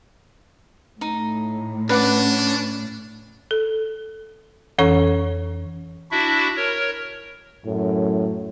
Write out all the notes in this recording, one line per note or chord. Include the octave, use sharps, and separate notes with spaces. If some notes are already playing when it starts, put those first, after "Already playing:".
A2 D#4
C#4 D4 B4 F#5 D6
A4
F2 E3 C#4 A4 C#5 C#6
D4 E4 F#4 E5
A#4 C#5
F#2 A2